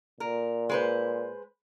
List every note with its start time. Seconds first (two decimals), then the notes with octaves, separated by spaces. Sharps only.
0.20 A#2 A#4
0.69 G#3 B4 C5